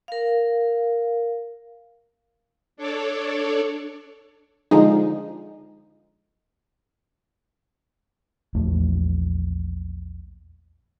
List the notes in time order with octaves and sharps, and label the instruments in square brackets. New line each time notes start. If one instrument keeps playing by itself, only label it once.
[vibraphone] A#4 F5
[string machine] D4 A4 C#5 D5
[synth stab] D3 F3 G#3 D#4
[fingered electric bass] A#1 E2 A3